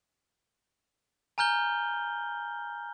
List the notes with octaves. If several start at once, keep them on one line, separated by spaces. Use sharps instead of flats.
G#5 A#5 F6 G6 G7